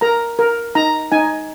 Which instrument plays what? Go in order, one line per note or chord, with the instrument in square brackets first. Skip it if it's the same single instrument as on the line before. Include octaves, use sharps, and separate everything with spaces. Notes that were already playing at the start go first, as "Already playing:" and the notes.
[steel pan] A#4 A#5
A#4
D#4 A#5
D#4 G#5